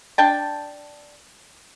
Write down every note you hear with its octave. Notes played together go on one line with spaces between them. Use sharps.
D4 G5 A5